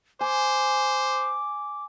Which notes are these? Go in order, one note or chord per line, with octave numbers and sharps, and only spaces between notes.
C5 G#5 D6